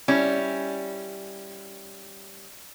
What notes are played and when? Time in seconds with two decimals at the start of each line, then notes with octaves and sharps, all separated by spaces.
0.08 G3 C#4 E4